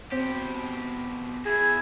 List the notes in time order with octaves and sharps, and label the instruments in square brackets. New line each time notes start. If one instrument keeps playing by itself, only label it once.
[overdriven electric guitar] B2 G4 [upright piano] C4
[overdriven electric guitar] E2 E4 [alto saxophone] G#4 [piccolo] G#6